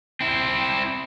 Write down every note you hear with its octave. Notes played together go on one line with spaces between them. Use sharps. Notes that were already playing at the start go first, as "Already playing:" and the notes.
C4 E4